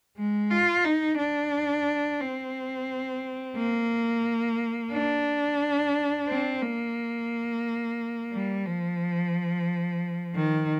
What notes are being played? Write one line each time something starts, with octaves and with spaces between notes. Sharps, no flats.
G#3
F4
D#4
D4
C4
A#3
D4
C4
A#3
G3
F3
D#3